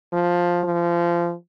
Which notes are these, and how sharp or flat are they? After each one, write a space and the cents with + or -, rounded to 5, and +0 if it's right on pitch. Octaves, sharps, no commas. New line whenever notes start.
F3 +5
F3 -25